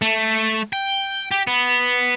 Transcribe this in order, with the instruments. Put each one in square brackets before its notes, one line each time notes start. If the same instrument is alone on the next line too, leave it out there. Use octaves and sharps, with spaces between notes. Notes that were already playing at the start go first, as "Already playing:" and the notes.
[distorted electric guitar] A3
G5
G4
B3